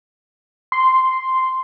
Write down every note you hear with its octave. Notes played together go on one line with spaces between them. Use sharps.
C6